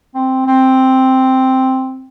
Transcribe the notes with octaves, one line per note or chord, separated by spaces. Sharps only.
C4
C4